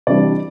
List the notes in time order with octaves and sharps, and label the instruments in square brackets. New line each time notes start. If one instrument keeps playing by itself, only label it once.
[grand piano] C3 E3 G3 D4 D5